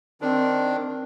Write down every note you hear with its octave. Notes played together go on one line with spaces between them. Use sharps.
D#3 C4 D4